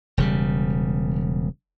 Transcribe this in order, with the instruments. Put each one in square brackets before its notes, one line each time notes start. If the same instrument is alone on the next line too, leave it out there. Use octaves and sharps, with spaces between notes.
[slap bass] E1 C#3 G3